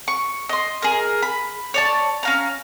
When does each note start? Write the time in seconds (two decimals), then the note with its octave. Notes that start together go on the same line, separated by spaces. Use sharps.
0.08 C#6
0.49 D#5 C6
0.82 G#4 A#4
1.22 B5
1.74 C#5 D5 A5
2.23 C#4 F5 A#5